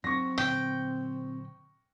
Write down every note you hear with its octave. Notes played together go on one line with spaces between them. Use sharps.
F#3 C4 C#6 A#6
A#2 D3 F#3 G5